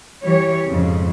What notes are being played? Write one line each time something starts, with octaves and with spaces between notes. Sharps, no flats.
E3 G3 G4 C#5
F2 G#2 C#3